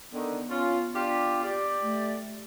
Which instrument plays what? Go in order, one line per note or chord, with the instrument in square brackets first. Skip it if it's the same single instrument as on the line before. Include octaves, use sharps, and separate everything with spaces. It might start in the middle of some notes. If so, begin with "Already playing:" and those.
[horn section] D3 D#3 [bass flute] B3
[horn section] C#4 F4
D4 F4 G4
G4 D5
[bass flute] A3